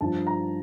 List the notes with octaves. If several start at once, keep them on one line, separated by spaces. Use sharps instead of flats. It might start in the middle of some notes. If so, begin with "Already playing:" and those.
G2 F3 A5
A#5